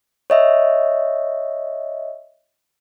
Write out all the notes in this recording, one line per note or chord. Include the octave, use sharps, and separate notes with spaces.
C#5 D#5 E5